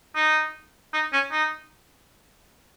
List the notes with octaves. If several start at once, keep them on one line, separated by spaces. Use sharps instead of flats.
D#4
D#4
C#4
D#4